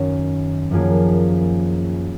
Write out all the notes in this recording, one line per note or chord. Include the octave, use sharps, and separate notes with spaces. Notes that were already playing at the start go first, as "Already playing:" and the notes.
Already playing: F#2 D#3 F#3 C#4
F#2 F3 A#3 F4 G#4